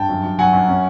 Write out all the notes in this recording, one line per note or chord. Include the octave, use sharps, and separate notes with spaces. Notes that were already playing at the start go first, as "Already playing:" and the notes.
Already playing: G2 G5 A5
F#2
F#2
F#3 F#5 G#5
F#2
C#4